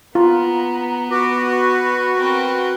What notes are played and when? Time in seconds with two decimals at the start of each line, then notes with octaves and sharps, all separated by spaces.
0.15 B3 F4 A#5
1.10 F#4 B4 D6
1.52 C#6
2.15 C4 A#4